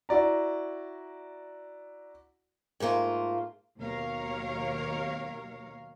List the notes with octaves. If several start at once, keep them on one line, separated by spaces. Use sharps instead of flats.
E4 F#4 D5 A#5
G#2 A3 A#3 F4
D#2 B2 F#3 A#4 C#5 F5